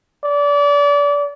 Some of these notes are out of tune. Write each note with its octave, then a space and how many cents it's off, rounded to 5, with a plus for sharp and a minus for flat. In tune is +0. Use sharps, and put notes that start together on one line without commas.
D5 -30